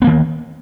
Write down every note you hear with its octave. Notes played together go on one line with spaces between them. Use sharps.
D#3 A#3 B3